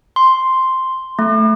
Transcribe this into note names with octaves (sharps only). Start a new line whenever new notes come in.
C6
A3